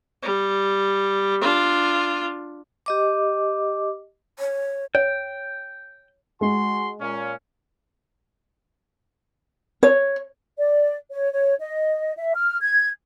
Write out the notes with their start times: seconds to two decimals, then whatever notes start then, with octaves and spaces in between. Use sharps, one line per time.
0.23 G3
1.42 D4 F4
2.86 G4 D#5 D6
4.39 C#5
4.95 C#5 G5
6.41 G#3 F#4 G#5 C6
7.00 A#2 C#4
9.83 C#5
10.58 D5
11.11 C#5
11.32 C#5
11.60 D#5
12.16 E5
12.35 F6
12.61 G#6